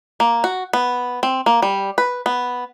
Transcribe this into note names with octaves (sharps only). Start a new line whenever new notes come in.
A#3
F#4
B3
C4
A#3
G3
B4
B3